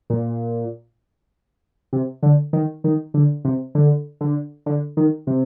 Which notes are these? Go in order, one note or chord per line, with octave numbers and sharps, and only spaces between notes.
A#2
C3
D3
D#3
D#3
D3
C3
D3
D3
D3
D#3
C3